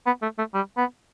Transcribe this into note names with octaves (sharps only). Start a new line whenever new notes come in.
B3
A3
A3
G3
B3